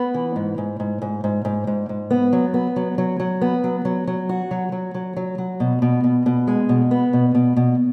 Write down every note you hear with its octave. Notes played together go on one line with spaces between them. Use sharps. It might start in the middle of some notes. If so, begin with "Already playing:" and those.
Already playing: B3
E3
G#2
G#2
G#2
G#2
G#2
G#2
G#2
G#2
B3
F#3
B3
F#3
F#3
F#3
B3
F#3
F#3
F#3
F#4
F#3
F#3
F#3
F#3
F#3
B2
B2
B2
B2
G#3
B2
B3
B2
B2
B2